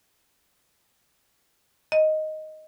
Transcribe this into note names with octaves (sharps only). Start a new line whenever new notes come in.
D#5